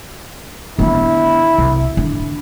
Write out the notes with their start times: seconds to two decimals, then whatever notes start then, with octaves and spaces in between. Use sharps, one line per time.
0.79 D3 B3 E4
1.58 C2
1.97 D3